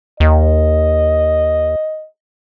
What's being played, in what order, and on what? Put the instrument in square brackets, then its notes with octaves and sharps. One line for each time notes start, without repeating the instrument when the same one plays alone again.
[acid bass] D#2 [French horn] D#5